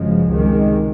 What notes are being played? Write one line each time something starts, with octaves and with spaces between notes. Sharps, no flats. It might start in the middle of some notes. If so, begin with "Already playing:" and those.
Already playing: G1 F#2 C#3 F3 G#3
C#2 C3 D#3 G#3